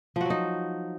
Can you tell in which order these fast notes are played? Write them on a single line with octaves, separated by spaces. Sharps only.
F3 F#4 F#3 D#4